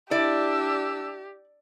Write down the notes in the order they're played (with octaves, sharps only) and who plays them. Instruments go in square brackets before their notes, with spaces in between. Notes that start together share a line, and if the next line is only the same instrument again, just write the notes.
[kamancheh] D4 E6 [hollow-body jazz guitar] E4 [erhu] G4 [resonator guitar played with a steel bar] D5